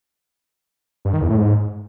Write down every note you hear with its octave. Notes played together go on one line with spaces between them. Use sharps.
G2
D#3
E2
A2
G#2